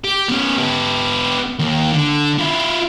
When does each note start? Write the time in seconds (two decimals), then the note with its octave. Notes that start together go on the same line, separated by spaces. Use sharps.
0.04 G4
0.29 B3 C#4
0.58 B3 G4
1.59 D#2
1.92 D3
2.38 E4 F4